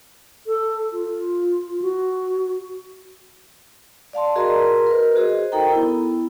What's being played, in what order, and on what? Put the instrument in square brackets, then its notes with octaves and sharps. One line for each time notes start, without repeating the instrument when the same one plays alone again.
[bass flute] A4
F4
F#4
[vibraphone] D5 F5 A5 C6
F#4 G#4 A#4 D#5 A#5 C6
A#4 B4
F#4 G#4 C5 D#5
D#4 A4 A#4 G5 A#5
B3 E4